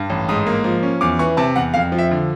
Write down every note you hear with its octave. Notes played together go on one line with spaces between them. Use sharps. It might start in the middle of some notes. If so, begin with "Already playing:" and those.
Already playing: G2
A1
G#2 D#6
A#3
F3
C#4
E2 D6
E3 C#6
C3 A5
E2 F#5
F2 F5
F3
E5
D3